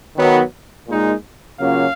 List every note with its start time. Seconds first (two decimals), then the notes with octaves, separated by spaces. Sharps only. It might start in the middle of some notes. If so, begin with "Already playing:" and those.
0.16 D#3 F#3 B3
0.87 A#2 G#3 D#4
1.59 C#3 F#3 A#3 C#4 F4 F5